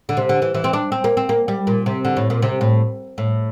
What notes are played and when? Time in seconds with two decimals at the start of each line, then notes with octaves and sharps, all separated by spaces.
0.09 D3
0.17 C3
0.29 D3
0.42 E3
0.54 E3
0.64 C4
0.73 D4
0.92 C4
1.04 A#3
1.17 C4
1.29 A#3
1.48 G3
1.67 A#2
1.86 C3
2.05 D3
2.17 A2
2.30 A#2
2.42 C3
2.61 A2
3.18 A2